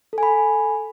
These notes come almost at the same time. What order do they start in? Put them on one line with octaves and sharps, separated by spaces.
A4 G#5 B5